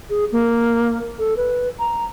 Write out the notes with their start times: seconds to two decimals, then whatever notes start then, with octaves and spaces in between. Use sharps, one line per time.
0.10 G#4
0.32 A#3
1.19 A4
1.37 B4
1.79 A#5